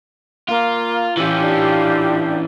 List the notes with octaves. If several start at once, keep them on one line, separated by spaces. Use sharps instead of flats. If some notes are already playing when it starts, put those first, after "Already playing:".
A#3 F4
E3 C#4 F4 G4
D4